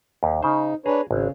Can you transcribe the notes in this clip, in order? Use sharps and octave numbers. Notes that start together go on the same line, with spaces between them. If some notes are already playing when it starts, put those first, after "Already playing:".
D#2
C#3 D#4 C5
D4 G#4 B4 C#5 A#5
G#1 C#3